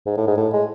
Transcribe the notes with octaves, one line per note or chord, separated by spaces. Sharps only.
G#2
A2
G#2
A2
G#3